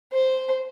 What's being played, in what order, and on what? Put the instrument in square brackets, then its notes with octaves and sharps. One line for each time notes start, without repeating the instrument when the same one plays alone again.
[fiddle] C5